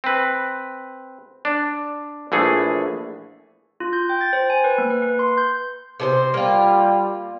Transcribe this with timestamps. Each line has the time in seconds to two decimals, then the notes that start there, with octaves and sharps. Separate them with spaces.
0.04 C4 B4
1.45 D4
2.32 A#1 E3 A3 G#4
3.80 F4
3.93 G6
4.09 G5
4.21 A6
4.33 C5
4.50 G#5
4.64 B4
4.78 A#3
4.90 B4
5.02 B4
5.19 C6
5.38 G6
6.00 C3 G#4 C5
6.34 G3 A#3 F4